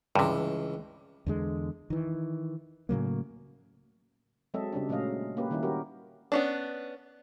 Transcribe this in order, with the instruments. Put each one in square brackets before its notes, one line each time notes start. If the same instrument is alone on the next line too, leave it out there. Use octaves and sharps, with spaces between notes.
[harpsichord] C#2 E3 [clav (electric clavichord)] G2 C3
[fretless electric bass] E2 D3 G#3
D#3 E3
A2 C#3 F#3 A#3
[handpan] F#3 G#3 C4 A4 D#5 E5
C#3 G3 C#4 D4
A#2 F#3 G#3 A3 D#5 F5
A#3 C#4 G4 B4
D#3 G3 C#4 D#4 E4
G3 C#4 F#4 G4 A#4
[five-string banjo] B3 C#4 D4